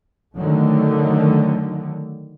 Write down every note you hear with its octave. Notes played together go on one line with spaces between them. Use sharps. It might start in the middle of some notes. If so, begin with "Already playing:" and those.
D3 D#3 F#3 A3